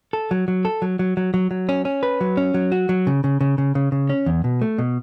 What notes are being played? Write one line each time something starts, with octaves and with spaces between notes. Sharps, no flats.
A4
F#3
F#3
A4
F#3
F#3
F#3
F#3
F#3
C#4
C#4
B4
F#3
C#4
F#3
F#4
F#3
C#3
C#3
C#3
C#3
C#3
C#3
C#4
E2
B2
A3
B2